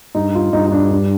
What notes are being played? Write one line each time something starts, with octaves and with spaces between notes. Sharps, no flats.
G2 D#4
F4
G2 D#4
D#4
D4
D4